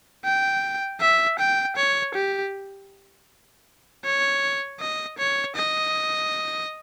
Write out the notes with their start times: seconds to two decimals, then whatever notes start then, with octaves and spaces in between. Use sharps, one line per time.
0.24 G5
1.01 E5
1.39 G5
1.76 C#5
2.15 G4
4.05 C#5
4.80 D#5
5.18 C#5
5.56 D#5